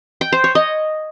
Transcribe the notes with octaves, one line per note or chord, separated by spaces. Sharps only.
G5
C5
C#5
D#5